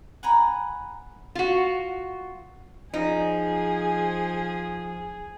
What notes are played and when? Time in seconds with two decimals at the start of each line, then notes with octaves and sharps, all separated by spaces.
0.23 F#5 G#5 A#5 B5
1.35 F4 F#4
2.94 F3 D#4 G#4